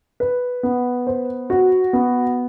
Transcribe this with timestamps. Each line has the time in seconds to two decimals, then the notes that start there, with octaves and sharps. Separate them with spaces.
0.20 B4
0.63 B3
1.07 C5
1.50 F#4
1.93 B3